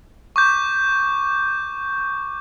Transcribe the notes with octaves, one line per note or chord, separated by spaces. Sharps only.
C#6 D6 G6